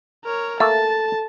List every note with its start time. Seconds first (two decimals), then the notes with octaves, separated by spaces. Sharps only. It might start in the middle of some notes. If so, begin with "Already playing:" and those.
0.24 A#4 C#5
0.60 A3 A#3 A4 E5 A5